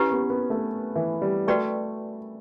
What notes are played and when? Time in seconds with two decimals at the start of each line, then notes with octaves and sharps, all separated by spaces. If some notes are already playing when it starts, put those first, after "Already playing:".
Already playing: C#4 E4 G4 B4 F#5 C#6
0.12 B3
0.30 B3
0.50 A3
0.96 E3
1.22 G3
1.47 A3 F#4 B4 D5 G5 C#6